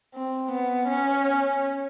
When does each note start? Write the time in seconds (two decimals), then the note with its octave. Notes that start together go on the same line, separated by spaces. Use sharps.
0.15 C4
0.52 B3
0.88 C#4